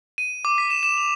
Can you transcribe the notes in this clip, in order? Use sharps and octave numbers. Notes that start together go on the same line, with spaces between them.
D#7
D6
B6
E7
E7
F7